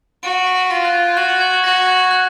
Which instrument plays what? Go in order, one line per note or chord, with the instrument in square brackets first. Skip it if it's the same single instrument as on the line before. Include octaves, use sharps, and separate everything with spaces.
[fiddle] F#4 [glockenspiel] D7
[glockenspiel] B6
[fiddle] F4 [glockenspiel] A#6
[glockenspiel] F#6
G#6
[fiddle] F#4 [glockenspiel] F#6
[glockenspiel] G#6
[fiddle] F#4 [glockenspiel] A#6
[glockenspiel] G#6
F#6